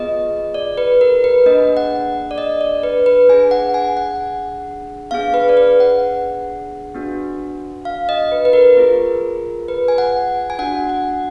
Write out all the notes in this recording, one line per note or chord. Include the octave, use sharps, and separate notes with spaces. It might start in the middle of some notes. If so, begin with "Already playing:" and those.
Already playing: B3 F4 G#4 D#5
D5
B4
A#4
B4
A#3 D4 G#4 D#5
F#5
D5
D#5
D5
B4
B4
D4 G#4 G#5
F#5
G#5
F#5
B3 D4 G#4 F5
B4
D5
B4
F#5
B3 D4 F#4
F5
D#5
B4
B4
A#4
B3 F4 G#4
B4
G#5
F#5
G#5
D4 F#4 F#5
F#5